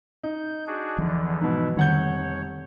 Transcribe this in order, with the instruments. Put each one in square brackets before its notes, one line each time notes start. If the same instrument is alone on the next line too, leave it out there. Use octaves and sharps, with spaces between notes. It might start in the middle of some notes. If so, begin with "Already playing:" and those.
[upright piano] D#4 [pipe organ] G6
[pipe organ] D4 F#4 G#4
[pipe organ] E2 D3 [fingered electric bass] E3 F3
[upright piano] G#2 B2 [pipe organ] E4
[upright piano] F1 F#5 G6 [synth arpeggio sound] D3 D#3 [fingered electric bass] G3 [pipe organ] C#5